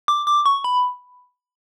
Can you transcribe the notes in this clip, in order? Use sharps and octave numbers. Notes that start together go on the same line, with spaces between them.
D6
D6
C#6
B5